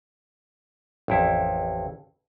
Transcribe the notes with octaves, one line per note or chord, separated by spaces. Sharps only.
A1 F2 E4